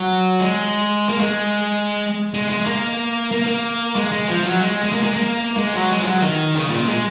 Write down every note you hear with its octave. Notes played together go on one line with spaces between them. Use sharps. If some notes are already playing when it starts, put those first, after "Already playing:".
Already playing: F#3
G#3
A#3
G#3
G#3
G#3
A#3
A#3
A#3
G#3
G#3
F3
F#3
G#3
G#3
A#3
G#3
A#3
G#3
F#3
G#3
F3
F#3
D#3
C#3
A#2
G#3